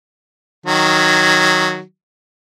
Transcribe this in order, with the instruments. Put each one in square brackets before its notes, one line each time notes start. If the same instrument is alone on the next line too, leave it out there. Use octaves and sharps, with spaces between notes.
[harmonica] D#3 F#3